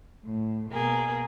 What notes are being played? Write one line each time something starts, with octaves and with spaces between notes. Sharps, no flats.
A2
B2 A#3 G#4